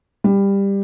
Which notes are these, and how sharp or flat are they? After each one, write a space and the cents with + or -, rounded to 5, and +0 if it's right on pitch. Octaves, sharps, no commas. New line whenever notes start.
G3 +15